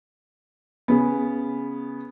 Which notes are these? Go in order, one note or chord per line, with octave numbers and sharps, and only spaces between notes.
C#3 B3